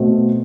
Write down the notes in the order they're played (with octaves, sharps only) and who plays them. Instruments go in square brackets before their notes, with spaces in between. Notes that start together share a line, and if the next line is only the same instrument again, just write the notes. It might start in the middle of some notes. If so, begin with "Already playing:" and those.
Already playing: [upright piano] B2 A3 C4